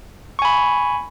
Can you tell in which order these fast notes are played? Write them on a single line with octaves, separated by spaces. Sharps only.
C#6 G#5 B5